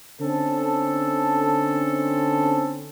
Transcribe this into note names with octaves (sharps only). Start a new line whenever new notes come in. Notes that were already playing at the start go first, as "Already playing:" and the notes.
D3 C4 C#4 D#4 A4